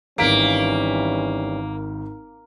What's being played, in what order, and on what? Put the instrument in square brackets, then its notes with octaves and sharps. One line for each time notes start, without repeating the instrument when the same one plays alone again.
[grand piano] G#1 B6 D7 [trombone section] E3 G3 C#4 [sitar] A#3